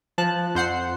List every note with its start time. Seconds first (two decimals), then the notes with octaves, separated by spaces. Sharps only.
0.18 F3 A5 F#6
0.55 F2 C5 F#5 C7